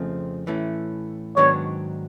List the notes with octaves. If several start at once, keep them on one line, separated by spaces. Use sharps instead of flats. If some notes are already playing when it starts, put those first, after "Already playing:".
Already playing: F2 C#3 F3 A3 C4
A2 E3 A3 C#4
G#2 D#3 F#3 B3 D4 C#5